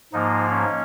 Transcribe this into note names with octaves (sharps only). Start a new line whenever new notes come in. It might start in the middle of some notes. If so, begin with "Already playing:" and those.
G#2 F3 A#3 D#4
C#4